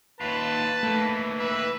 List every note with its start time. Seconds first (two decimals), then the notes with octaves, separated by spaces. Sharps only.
0.21 D#2 F4 B4 A5
0.83 E3 A3 A#3
1.39 B4 E5